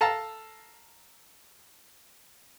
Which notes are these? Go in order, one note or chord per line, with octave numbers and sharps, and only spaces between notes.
A4 F5 A5 A#5